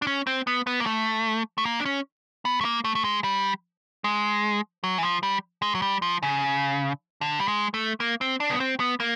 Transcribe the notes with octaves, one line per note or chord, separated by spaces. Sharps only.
D4
C#4
C4
B3
B3
A#3
A3
A3
A#3
D4
C#4
B3
A3
A#3
A3
A3
G#3
G3
G#3
F#3
E3
F3
G3
G#3
F#3
G3
F3
C#3
D3
G3
G#3
A3
A#3
C4
D4
B3
C4
B3
A#3